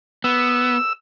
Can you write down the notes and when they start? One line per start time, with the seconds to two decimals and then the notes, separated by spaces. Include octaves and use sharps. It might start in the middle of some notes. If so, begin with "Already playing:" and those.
0.24 B3 E6